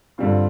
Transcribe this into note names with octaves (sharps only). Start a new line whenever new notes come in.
G2 D3 G3 C4 F4